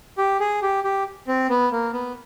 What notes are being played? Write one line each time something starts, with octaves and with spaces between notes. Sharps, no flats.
G4
G#4
G4
G4
C4
B3
A#3
B3